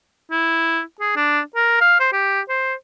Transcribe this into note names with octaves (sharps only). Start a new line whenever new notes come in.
E4
G#4
D4
A#4
F5
C5
G4
C5